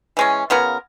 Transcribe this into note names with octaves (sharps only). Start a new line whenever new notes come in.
E3 G#3 C#4
C#3 B3 F4 A#4